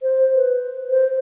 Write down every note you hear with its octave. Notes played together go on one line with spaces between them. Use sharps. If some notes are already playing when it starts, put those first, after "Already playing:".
C5
B4
C5